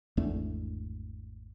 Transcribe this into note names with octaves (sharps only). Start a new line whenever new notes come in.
G#1 E2 A3 D4